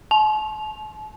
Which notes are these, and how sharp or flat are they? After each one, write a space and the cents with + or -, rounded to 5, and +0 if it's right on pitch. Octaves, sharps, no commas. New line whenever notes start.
A5 -40